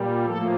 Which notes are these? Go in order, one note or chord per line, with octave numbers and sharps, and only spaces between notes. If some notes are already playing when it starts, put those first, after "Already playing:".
Already playing: A#2 G3
A2 F3 A#3 A4